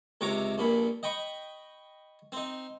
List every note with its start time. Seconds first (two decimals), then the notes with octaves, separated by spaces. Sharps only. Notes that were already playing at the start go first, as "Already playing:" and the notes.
0.21 C#2 C3 C#5 A#5 D6
0.58 A#1 G2 A#2 B5
1.03 D#5 G5 B5 C#6
2.32 C4 D#4